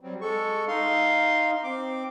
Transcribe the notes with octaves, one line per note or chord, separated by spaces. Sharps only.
F#3 G3 C4
G#3 A4 C#6
D#4 F5 C6
C4 D6